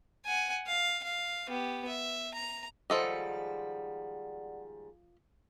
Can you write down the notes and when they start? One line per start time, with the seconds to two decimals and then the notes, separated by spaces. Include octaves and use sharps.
0.25 F#5 G#5
0.67 F5
1.03 F5
1.48 B3 G4
1.87 E5
2.34 A#5
2.90 D#2 G#2 F3 G3 A4 D5 D#5 F#5